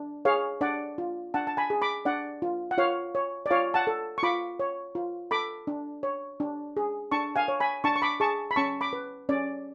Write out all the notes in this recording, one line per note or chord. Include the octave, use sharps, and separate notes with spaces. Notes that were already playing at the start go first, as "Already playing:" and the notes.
Already playing: D4
G#4 C#5 F5
D4 D5 F#5
F4
D4 F#5 A5
A5
G#5 B5
G#4
B5 D6
D4 D5 F#5
F4
F#5
F4 C#5 F5
C#5
D5
F4 C#5 F5
F#5 A5
A4
C#6
F4 B5 D6
C#5
F4
A4 B5 D6
D4
C#5
D4
G#4
D4 A5 C#6
F5 G#5
C#5
G#5 B5
D4 A5 C#6
C#6
B5 D6
G#4 A5 C#6
B5
C#4 A5 C#6
B5 D6
B4
C#4 D5